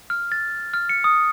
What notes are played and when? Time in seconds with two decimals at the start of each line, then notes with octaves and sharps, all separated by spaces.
0.10 F6
0.32 A6
0.74 F6
0.89 C#7
1.04 D#6